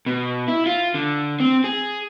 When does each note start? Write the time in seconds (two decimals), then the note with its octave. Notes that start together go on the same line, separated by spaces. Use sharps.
0.06 B2
0.48 E4
0.66 F4
0.94 D3
1.40 C4
1.64 G#4